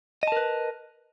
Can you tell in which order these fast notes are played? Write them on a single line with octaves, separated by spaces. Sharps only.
D#5 A5 A#4 B4